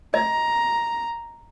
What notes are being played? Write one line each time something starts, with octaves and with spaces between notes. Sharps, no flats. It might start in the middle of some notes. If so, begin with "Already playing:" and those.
D#5 A#5